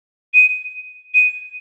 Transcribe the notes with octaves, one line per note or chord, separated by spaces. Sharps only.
D#7
D#7